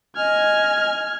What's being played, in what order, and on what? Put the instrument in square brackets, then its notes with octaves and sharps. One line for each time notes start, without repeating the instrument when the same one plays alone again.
[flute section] D#5 G#5 [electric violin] F6 G#6